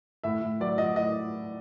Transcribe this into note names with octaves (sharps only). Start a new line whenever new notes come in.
A2 E5
A2
F#3 D5
F#3 D#5
A2 D#5